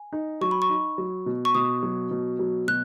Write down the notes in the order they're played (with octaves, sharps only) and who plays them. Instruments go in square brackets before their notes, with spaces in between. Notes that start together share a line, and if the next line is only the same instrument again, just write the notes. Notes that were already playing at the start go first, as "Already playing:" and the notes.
Already playing: [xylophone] G#5
[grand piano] D#4
[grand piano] F#3 [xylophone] C#6
[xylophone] B5
C#6
[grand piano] D#4
F#3
B2
[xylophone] C#6
[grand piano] B2 [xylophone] D#6
[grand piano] F#3
B2
F#3
[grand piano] B2 [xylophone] F#6